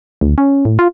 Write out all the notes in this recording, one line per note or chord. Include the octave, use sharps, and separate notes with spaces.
D2
C#4
A2
F4